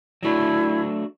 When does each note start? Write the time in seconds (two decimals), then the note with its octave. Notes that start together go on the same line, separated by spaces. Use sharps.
0.23 F#3 A3 D4 E4 F#4